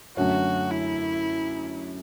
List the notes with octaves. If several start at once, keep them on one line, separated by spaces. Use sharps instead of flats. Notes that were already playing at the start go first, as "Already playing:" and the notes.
F#2 D3 A3 C#4 F#4
E4